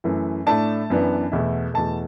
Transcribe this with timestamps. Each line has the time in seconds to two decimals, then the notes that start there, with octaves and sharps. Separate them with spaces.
0.04 F#2 E3 A3
0.46 A2 A3 D4 A5
0.90 F#2 E3 B3 D4
1.32 E2 B2 A3 E4
1.74 E2 B2 A3 A5